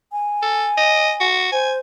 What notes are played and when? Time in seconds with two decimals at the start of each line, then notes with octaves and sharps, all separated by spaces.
0.12 G#5
0.42 A4
0.77 D#5
1.20 F#4
1.52 C5 G#5